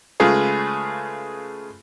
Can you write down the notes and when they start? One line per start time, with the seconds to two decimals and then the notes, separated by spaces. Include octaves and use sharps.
0.20 C#3 G#3 A3 F4 G#4 B4